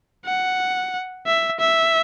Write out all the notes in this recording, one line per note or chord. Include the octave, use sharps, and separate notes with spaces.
F#5
E5
E5